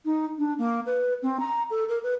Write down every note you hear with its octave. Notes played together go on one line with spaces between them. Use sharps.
D#4
D4
A#3
B4
C4
A#5
A4
A#4
B4